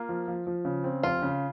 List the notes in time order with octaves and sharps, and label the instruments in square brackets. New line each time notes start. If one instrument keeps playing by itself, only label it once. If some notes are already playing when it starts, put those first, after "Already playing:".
Already playing: [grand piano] A#3 [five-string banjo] F4
[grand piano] F3
F3
F3
C#3
C4
[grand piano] F1 [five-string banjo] F4
[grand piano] C#3